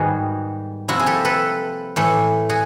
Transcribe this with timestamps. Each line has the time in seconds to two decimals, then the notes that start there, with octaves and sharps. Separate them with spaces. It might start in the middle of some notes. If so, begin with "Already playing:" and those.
Already playing: G#2 D#3 G3 B3 F#4 G#4
0.88 C3 F3 A#3 E4 F#4
0.99 G#4
1.06 G4 A4
1.25 A4 B4
1.96 A2 E3 A3
2.49 F#4 G#4